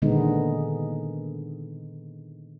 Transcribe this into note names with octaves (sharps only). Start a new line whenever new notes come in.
A#2 D3 D#3 G#3 B3 D#4